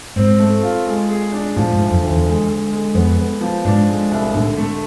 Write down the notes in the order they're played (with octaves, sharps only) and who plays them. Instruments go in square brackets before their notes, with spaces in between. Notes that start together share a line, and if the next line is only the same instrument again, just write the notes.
[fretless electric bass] G#2 [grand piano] C4
[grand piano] A3
F4
G#3
G#4
D4
[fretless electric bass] A2 [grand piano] F3
[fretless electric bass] G#2
[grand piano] D2
[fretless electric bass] F2
[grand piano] D2
[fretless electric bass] E2
[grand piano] G#3
G#3
G#3
[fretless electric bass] F2 [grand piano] B3
[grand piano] B3
F3
[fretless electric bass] G#2 [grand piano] D4
[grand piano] G#3
C2
[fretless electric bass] A2 [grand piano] D3
[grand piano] A3